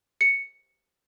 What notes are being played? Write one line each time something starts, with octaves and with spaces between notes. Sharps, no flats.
C#7